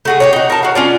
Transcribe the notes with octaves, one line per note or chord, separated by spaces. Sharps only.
A3 F#4 G#4
G4 G#4 C#5
D#4 F#4
A#4 A5
F#4 F5
C#4 F4 D5